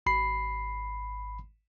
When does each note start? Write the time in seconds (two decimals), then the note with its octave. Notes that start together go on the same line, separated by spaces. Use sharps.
0.06 G#1 B5 C7